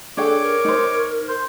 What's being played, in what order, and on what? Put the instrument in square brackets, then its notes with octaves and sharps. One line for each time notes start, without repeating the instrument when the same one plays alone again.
[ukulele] D4 G#4 G5 [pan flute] A4 [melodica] C#5 D6
[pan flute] A#4
[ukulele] D#4 C5
[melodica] C5